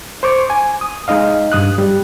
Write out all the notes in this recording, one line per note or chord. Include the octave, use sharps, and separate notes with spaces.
C5 C#6 D6
G#5
D#6
G#3 D#4 D#5 F5
G2 D#6 F#6
G3